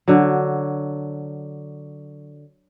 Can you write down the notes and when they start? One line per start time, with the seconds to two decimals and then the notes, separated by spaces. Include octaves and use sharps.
0.08 D3 F#3